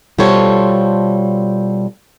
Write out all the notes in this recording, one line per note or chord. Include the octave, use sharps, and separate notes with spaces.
B2 G3 F4 A4 C5 C#5